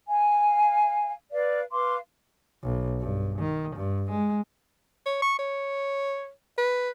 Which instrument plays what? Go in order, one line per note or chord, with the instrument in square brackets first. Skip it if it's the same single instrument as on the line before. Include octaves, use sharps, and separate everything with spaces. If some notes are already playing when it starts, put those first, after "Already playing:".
[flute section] F5 G#5
B4 D5 F5
B4 F5 C6 D6
[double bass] B1
G2
D#3
G2
G#3
[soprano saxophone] C#5
C#6
C#5
B4